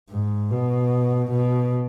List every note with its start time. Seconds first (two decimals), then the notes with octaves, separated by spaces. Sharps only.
0.10 G#2
0.51 B2
1.31 B2